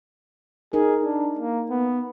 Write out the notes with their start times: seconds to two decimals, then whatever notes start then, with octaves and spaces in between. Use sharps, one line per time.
0.73 D#4 G#4 A#4
1.04 D4
1.39 A#3
1.70 B3